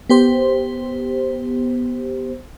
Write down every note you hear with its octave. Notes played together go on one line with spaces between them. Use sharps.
B3 G4 C5